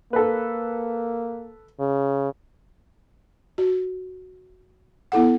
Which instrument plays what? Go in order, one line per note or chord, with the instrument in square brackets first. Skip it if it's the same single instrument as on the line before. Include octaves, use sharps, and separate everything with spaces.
[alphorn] A#3 [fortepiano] A4 B4
[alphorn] C#3
[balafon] F#4
B3 E4 A4 F#5